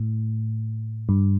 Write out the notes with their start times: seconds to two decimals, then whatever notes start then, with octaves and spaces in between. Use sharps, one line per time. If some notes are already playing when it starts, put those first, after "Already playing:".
Already playing: A2
1.09 G2